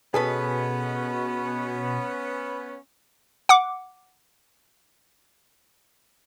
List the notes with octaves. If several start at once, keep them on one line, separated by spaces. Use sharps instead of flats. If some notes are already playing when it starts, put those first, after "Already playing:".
B2 B3 C#4 G#4 A4 B4
F#5 D6